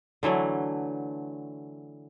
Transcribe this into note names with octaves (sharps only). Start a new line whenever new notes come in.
D3 E3 F#3 A3